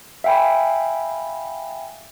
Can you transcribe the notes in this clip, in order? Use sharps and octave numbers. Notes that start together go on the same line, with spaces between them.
E5 F5 G5 G#5 B5